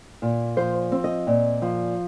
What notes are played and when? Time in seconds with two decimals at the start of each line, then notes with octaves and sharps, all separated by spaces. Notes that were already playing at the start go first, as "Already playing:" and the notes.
0.22 A#2
0.57 F3 C5
0.92 C4
1.04 D#5
1.27 A#2
1.62 F3